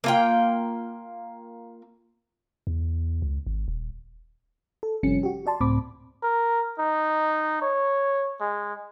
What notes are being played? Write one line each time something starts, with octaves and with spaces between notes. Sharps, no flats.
A#3 F4 G5
E2
C#2
G#1
D#1
A4
G1 C3 F3 G3 C#4 C#7
F#4 G4
F#4 D5 A5 C6
C#2 A2 C4 B5 D6
A#4
D#4
C#5
G#3